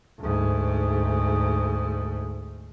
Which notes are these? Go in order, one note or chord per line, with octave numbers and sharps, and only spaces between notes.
D2 G#2